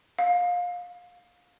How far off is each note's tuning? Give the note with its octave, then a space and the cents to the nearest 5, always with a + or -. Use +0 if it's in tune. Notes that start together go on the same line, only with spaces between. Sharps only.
F5 +25